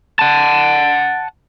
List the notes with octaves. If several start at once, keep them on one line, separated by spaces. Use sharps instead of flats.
F#5 A5